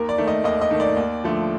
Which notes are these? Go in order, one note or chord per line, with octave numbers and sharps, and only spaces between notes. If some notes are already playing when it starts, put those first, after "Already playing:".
Already playing: D#2 A#4
D5
D#3 A3
D#5
D#2 D#5
D#5
D#3 A3
D5
D#2
D3 F3 A3